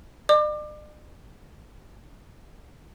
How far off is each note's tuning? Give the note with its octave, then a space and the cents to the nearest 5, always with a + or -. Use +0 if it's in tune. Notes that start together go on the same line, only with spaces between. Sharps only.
D5 +45 D6 +25